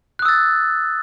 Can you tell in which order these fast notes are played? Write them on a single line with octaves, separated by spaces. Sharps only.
F#6 D#6 E6 A6